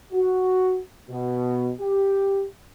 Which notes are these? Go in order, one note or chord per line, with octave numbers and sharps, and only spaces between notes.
F#4
B2
G4